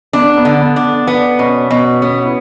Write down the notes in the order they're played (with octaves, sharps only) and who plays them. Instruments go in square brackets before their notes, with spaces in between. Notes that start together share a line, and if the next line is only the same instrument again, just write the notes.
[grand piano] B3 [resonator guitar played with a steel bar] D4
[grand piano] B3
[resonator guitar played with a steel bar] D3
[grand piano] B3
[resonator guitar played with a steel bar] D4
[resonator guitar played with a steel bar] B3 [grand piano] D4
[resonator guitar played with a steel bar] B2 [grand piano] C#4
[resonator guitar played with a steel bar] B2 [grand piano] B3
[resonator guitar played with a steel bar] B3 [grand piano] C#4
[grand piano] E4